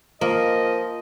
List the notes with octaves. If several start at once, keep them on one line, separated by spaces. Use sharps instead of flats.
F3 A#3 D#5